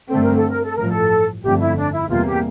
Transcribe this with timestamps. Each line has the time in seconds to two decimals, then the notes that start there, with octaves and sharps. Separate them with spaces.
0.09 G2 D3 A3 C4 A4
0.22 A#4
0.36 A4
0.49 A#4
0.64 A4
0.76 A1 G2 F3 A#4
0.90 A4
1.43 G1 F2 D3 A3 G4
1.60 E4
1.77 D4
1.93 E4
2.09 E2 C3 G3 A#3 F4
2.27 G4